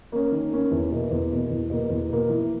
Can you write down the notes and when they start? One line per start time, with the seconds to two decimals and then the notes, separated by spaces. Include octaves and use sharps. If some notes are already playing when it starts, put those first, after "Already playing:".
0.12 A#3 C#4
0.32 D#3
0.52 A#3 C#4
0.71 E2
0.91 B2 A#3
1.11 E2
1.31 B2 A#3
1.50 E2
1.70 B2 A#3
1.90 E2
2.09 B2 A#3
2.29 E3